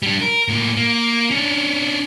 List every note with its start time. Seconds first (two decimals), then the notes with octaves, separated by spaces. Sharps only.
0.03 G3 D4
0.21 A#4
0.48 A2 A#3
0.77 A#3
1.31 C#4 D4